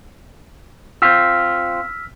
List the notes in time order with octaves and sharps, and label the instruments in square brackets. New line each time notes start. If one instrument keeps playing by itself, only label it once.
[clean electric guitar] C4 F4 [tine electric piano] E6 F6 B6